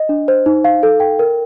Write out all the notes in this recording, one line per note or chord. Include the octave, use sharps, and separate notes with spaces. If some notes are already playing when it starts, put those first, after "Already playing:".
Already playing: D#5
D4
C5
D#4
F5
A4
G5
A#4